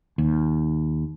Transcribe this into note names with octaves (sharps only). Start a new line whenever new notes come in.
D#2